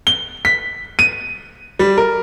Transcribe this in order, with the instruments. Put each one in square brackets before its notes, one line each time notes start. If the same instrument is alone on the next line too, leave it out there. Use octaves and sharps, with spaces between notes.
[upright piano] G7
B6
D#7
G3
A#4